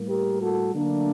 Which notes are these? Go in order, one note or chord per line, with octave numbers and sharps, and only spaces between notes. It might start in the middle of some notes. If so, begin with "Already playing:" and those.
Already playing: A2 G3 A#3
G4 A#4
F#4 A4
D3 F#3 A3 A#3 D4